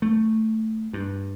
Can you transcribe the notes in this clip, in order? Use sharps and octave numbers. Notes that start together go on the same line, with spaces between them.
A3
G2